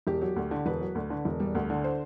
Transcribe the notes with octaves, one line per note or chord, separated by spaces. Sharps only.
E1 G4
F#3
D2
D3
E1 B4
F#3
D2
D3
E1
G3
D2
D3
C5